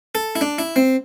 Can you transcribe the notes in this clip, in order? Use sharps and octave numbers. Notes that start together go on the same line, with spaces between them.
A4
E4
D4
E4
C4